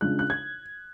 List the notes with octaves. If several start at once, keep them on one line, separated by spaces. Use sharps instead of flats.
C#3 G#3 D4 F4 F#6
F#6
G#6